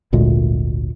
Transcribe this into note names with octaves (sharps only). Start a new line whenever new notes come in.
G#1 D2 A#2 G#3